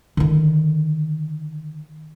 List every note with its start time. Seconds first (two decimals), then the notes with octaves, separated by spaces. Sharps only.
0.17 D3 D#3